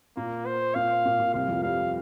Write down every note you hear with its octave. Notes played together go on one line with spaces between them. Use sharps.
A#2 A#3
C5
A#2 F5
A#2
A#2
C2 C3 F5
F2 F3
G2 G3 F5